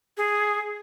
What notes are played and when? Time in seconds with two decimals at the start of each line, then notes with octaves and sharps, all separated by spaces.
0.17 G#4